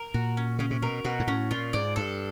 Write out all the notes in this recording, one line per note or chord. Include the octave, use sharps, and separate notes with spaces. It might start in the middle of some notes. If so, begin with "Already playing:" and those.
Already playing: A#4
A#2 F#4
C#4
C#3 C#4
C3
B2 A#4
B2 F#4
G#2
A2 C#4
A#2 F4
G#2 D5
G2 A4